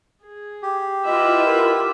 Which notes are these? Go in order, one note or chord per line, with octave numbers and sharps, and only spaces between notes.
G#4
G4
E4 F4 B4 D#5 E5 F#5
A#4